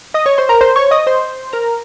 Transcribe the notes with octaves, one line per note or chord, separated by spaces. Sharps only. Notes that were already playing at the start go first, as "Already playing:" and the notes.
D#5 D#6
C#5 C#6
C5 C6
A#4 A#5
C5 C6
C#5 C#6
D#5 D#6
C5 C6
A#4 A#5